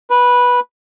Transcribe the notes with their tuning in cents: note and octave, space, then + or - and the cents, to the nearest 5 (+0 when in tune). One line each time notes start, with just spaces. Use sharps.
B4 -10